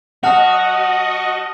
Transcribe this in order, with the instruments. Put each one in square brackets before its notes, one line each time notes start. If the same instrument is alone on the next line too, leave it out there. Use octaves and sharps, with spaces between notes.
[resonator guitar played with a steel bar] F#3 F#5 [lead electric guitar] F#4 [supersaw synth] D#5 [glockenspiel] A5 F6 F7